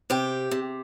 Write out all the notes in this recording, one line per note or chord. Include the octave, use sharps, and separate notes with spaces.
C3 G4
C3